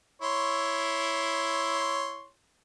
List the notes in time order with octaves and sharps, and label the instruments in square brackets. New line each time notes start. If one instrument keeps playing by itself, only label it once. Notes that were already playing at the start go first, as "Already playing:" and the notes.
[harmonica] E4 C#5 C6